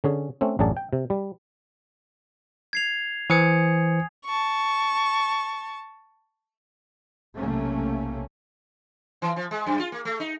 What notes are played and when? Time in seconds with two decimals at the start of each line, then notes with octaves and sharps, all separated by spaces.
0.04 D3 C#4 G#4
0.41 A3 C4 C#4
0.59 A1 F#2 F#3 D4 G#4 A5
0.77 G5
0.93 C3
1.10 G3
2.73 G#6 C7 F7
3.30 E3 C5 G#5 D#6 G#6 C#7
4.26 A5 C#6
7.38 B1 C3 A3 A#3 C#4
9.22 E3
9.36 F3
9.51 G#3
9.66 F#2
9.80 F4
9.92 A#3
10.05 A3
10.20 D#4